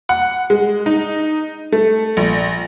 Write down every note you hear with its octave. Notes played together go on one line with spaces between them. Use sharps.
F#5
G#3
D#4
A3
A#1